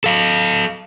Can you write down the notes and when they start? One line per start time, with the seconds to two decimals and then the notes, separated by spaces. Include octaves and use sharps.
0.04 A4 F5